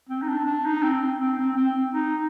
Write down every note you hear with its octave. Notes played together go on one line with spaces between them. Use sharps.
C4
D#4
D4
D4
D#4
C4
C4
C4
C4
D#4